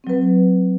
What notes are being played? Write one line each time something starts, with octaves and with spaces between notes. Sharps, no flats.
F#3 C4 B4